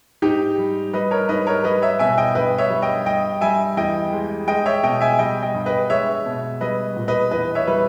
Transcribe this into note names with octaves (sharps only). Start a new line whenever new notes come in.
G#2 D#4 G4
G3
G3 B4 D#5
A#4 C#5
G#2 B4 D#5
A#4 C#5
G3 B4 D#5
C#5 E5
B2 E5 G#5
D#5 G5
G2 B4 D#5
C#5 E5
G3
D#5 G5
G2 D#5 G5
G3 E5 G#5
E2 D#5 G5
G#3
G#3 D#5 G5
C#5 E5
B2 D#5 G5
E5 G#5
G3 D#5 G5
D#5 G5
G2
B4 D#5
G#3 C#5 E5
B2
G3 B4 D#5
A#2
B4 D#5
E2 B4 D#5
C#5 E5
G3 B4